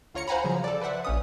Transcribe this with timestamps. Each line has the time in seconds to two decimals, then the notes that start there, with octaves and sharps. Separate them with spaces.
0.14 D2 F4 C#5 A#5 C#7
0.28 C5 F5 F#5 G#5 A#5 B5
0.44 C#3 F3 F#3
0.64 A4 D5
0.81 B4 C5 E5 F#5
1.04 A#1 C#4 D#6